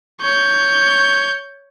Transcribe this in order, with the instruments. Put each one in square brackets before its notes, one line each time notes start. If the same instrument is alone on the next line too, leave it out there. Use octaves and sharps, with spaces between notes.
[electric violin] C#5 G6